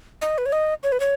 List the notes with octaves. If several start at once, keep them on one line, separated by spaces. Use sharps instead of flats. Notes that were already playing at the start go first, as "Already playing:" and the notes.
D#5
B4
C#5
D#5
C#5
B4
C#5